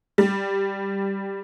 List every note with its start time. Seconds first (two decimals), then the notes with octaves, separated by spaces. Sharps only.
0.18 G3